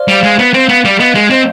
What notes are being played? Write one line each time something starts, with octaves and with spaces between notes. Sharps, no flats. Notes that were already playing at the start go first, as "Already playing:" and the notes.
Already playing: C5 D5 F5
G3
G#3
B3
C4
B3
G3
B3 D#5
G#3
C4